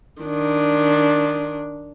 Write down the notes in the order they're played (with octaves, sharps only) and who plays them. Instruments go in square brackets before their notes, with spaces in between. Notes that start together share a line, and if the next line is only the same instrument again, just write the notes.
[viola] D#3 D4